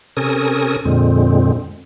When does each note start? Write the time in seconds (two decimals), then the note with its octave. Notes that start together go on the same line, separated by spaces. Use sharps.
0.17 C3 C#4 A4 A#4 G#5 D#6
0.85 F2 A#2 D3 G#3 C4